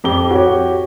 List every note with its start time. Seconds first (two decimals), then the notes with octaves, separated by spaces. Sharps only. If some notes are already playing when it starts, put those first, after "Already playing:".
0.04 F2 G4 G7
0.31 F#4 G4 C#5